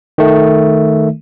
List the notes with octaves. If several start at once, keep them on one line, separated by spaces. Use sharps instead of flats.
D#3 A3